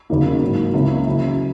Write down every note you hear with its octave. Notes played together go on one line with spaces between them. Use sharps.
E2 C#3 F#3 A#3 D#4
G#2 F#3 A#3
C#2 C#3 E3 A#3 C#4
C#3 F#3 C#4 E4